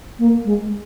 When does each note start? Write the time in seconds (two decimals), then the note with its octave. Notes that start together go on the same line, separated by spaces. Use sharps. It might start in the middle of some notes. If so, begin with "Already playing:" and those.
0.19 A#3
0.45 G#3